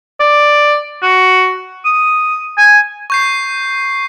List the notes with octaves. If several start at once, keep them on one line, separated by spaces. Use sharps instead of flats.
D5
F#4
D#6
G#5
C#6 G6 C7